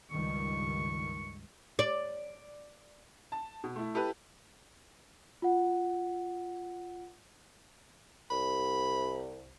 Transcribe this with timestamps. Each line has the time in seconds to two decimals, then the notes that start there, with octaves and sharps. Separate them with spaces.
0.11 C#2 G2 D#3 C#6
1.79 D5
3.32 A5
3.64 B2
3.76 A3 E4
3.94 E4 G4 A4 B4
5.42 F4 F#5
8.30 C2 B5